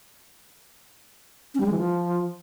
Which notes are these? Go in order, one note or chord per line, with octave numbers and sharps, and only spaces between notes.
C#4
G3
G#3
E3
F3